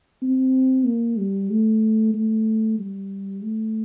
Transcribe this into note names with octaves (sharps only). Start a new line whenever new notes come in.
C4
A#3
G3
A3
A3
G3
A3